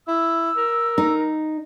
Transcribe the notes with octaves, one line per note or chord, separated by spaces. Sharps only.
E4 E6
A#4
D#4